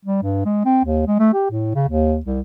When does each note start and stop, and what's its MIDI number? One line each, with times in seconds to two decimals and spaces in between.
0.05 0.22 55
0.23 0.44 43
0.45 0.61 56
0.65 0.81 60
0.85 1.03 39
1.07 1.18 56
1.19 1.32 57
1.33 1.47 67
1.51 1.73 45
1.75 1.84 49
1.88 2.20 39
2.26 2.40 36